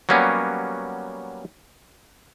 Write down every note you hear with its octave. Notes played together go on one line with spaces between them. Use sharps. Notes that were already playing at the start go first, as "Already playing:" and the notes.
F#3 G3 A#3 B3 C#4